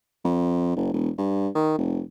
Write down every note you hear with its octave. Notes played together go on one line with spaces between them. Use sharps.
F2
F#1
E1
G2
D#3
F1